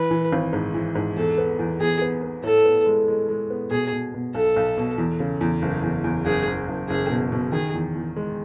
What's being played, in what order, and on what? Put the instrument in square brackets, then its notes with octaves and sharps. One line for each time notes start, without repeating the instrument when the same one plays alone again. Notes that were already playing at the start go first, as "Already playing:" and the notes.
Already playing: [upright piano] E3 [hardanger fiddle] B4
[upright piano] E3
G#1
G#2
E3
G#2
[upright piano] E2 [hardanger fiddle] A4
[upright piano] B3
E2
[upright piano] E2 [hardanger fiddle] G#4
[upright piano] B3
B3
[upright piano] A2 [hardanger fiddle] A4
[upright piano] B3
G#3
G#3
G#3
B3
[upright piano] B2 [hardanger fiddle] G#4
[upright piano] B2
B2
[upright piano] B1 [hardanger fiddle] A4
[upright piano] B1
B2
E2
C#3
E2
F#1
E2
E2
[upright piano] F#1 [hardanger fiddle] G#4
[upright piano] F#1
F#1
[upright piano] F#1 [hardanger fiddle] G#4
[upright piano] B2
B2
[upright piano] D#3 [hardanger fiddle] G#4
[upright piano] E2
E2
G#3